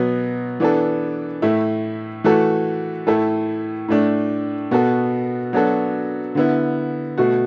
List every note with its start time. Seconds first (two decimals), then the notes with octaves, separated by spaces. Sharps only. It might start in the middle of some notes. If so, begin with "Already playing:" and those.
Already playing: B2 F#3 B3
0.60 E3 B3 D4 A4
1.42 A2 A3 E4
2.24 E3 A3 F#4 A4
3.07 A2 A3 E4 A4
3.88 A2 A3 D4
4.71 B2 B3 F#4 A4
5.53 F#3 B3 D4 F#4 A4
6.35 D3 B3 E4
7.18 B2 A3 F#4